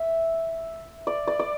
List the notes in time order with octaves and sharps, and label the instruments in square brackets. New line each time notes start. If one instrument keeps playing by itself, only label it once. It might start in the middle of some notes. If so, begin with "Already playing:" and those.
Already playing: [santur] E5
D5
D5
D5